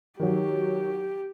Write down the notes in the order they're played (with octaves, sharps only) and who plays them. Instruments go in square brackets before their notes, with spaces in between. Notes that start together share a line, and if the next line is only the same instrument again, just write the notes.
[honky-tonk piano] D#3 F#3 [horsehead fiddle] G4